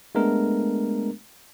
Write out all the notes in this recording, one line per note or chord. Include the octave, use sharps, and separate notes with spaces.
G#3 A3 B3 D4 A#4